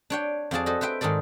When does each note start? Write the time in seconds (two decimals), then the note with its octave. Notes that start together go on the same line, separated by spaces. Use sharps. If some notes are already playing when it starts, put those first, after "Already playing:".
0.10 D4 C#5 G5
0.51 F2 F3 F#4 G#4 D5 A5
0.66 F#4 A4 C5 D#5
0.81 B4 C5 E5 G5
1.01 G#2 D#3 G#4 A4 D5